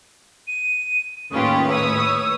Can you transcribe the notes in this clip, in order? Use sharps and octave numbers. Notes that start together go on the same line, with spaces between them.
D#7
D#2 A2 C#4 F4 G4 B4 D#6
C#5 D#6 E6